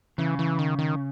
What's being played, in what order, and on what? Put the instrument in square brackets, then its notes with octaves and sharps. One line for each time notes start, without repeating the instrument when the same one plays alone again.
[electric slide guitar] C#3 [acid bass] E3
[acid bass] E3
D#3
D#3